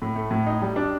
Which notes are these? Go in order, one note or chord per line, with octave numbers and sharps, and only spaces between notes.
A2
A3
A2
D#4
G3
D4